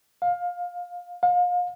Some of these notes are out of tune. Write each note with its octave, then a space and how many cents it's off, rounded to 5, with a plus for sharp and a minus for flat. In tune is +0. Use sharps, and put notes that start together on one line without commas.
F5 +20
F5 +35